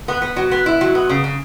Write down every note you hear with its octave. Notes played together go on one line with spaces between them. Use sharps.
B3
B3
F#3
B3
E4
F#3
B3
C#3
C#3